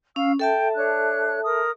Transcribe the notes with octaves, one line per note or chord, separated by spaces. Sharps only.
C#4 F5 E6
A4 E5 G5 A5
D4 C#5 F#6
A#4 D#6